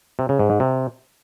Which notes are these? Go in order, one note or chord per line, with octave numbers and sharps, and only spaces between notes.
C3
C#3
G#2
G#2
C3